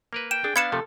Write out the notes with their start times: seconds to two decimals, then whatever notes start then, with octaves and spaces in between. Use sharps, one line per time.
0.13 A#3 A#4 B4
0.31 G5 E7
0.44 D4 G#4
0.56 B3 D4 F5 A5 B5 G#6 C#7 E7
0.72 C3 F3 A3 A4